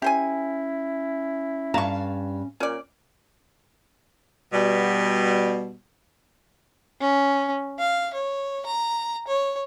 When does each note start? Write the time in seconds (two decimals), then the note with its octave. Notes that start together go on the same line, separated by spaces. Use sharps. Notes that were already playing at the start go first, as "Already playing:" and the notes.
0.02 C#4 E4 G4 C5 G#5
1.74 G2 F5 A5 A#5 C#6
2.60 A#2 C#4 D5
4.53 B2 G3
7.01 C#4
7.79 F5
8.14 C#5
8.66 A#5
9.28 C#5